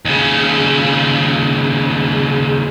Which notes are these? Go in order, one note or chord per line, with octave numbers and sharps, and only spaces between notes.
D#2 C#3